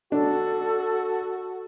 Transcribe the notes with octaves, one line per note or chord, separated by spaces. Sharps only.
D4 F#4 A4